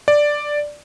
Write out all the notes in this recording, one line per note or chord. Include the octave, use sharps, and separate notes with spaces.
D5